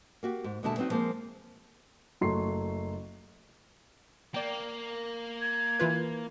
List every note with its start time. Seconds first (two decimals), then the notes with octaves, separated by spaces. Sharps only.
0.23 A#3 F#4 G4
0.44 G#2
0.63 D#2 B2 D3 G#3 E5 A5
0.77 F#3 B3 C4 D#4 F#4
0.90 F3 G#3 A#3 C4 C5
2.21 F#1 F#3 A3 C6 C#6 C7
4.34 A#3 D5 G5
5.41 G#6
5.79 E3 F4 B4